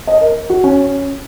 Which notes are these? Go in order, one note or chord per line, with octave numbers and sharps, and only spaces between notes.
D#5
A#4
F#4
C#4